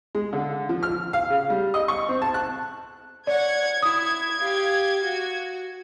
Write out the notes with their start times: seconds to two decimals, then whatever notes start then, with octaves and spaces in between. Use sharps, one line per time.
0.15 G#3
0.33 D3
0.69 F3
0.83 F6
1.13 F5
1.30 C#3
1.50 G3
1.74 D#5
1.88 C#6
2.09 C4
2.22 A5
2.34 F#6
3.27 C#5 D5 F#5 G#6
3.83 E4 D#6
4.39 G4 F5
5.03 F#4